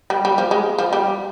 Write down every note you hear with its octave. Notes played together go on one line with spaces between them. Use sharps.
G3
G3
F3
G#3
F3
G3